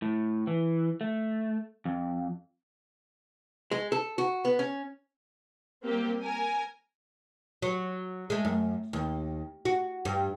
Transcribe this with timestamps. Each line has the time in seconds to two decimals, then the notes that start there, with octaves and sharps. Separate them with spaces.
0.02 A2
0.47 E3
1.01 A3
1.85 F2
3.71 G#3
3.92 A4
4.18 F#4
4.45 B3
4.59 C#4
5.84 G3 A#3 C4 G4
6.22 A#4 G#5
7.62 F#3
8.30 G#3 A3
8.45 F#2
8.93 D#2
9.65 F#4
10.05 G2